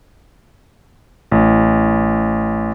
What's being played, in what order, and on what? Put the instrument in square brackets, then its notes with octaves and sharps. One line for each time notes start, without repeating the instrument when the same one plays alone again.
[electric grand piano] A1